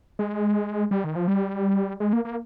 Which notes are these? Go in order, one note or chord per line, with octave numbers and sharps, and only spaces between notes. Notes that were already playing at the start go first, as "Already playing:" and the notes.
G#3
G3
D#3
F3
G3
G#3
A#3
A#3